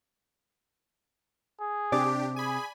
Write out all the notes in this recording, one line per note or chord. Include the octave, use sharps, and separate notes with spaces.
G#4
C3 D4 G4 D5
G#4 G#5 B5